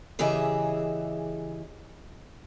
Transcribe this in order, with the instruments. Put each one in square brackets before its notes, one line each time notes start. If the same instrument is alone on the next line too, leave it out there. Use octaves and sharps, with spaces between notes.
[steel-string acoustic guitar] C#3 E3 G4 G#4 D#5 E5